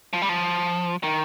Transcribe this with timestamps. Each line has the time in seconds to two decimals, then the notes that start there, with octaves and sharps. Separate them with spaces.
0.13 F3
0.22 G3
0.29 F3
1.03 D#3